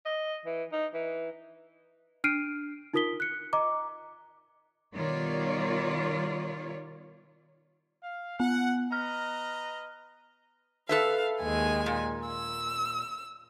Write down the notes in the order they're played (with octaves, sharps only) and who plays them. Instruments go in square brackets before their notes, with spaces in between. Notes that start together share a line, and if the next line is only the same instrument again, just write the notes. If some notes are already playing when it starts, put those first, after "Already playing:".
[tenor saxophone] D#5
E3
D#4
E3
[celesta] D4 F6 C7 D7 D#7
D#4 F4 A#4 D#6 B6 G7
F#6 C#7
D#5 A#5 D6
[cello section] B2 D#3 G3 F4 C#5 D5
[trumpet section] F5
[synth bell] B3 [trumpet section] F#5
[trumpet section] B4 D#5 A#5 [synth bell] F6
[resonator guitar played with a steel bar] A4 B4 E5 [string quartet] F5
[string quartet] D#2 G#3 G#5
[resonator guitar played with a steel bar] A#2
[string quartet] E6